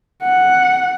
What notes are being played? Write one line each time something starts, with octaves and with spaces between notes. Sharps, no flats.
F#5